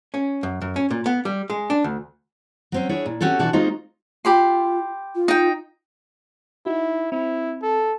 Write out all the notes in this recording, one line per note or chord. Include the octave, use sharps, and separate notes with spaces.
C#4
F#2
F#2
C#4
A#2
B3
G3
G#3
D4
D2
F#3 C4 C#4
D4 E4 G#4 C#5
A#2
C4 C#4 F#4 G4 A4
B2 D3 E3 F#4 D5 A5
G#3 A#3 C4 D#4 F4 F#4
F4 G4 B5 C6
F4
D#4 G5
D#4 E4 F#4
C4 E4
A4